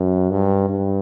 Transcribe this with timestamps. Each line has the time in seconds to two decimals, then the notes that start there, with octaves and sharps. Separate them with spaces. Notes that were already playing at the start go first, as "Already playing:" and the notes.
Already playing: F#2
0.30 G2
0.69 G2